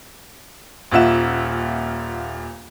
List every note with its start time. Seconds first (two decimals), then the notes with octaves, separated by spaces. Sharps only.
0.91 D#1 A#2 F4 E5 F#5 E7